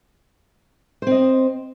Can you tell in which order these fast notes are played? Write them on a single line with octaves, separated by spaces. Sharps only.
C5 C4 D#5